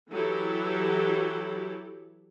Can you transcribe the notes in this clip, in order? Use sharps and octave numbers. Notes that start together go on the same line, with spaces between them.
E3 F#3 E4 G4 A4